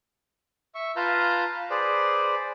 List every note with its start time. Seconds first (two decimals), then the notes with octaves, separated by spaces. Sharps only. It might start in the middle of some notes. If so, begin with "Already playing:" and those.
0.75 E5 C#6
0.96 F4 B4 F5 A5 A#5 G6
1.70 G#4 B4 C5 D5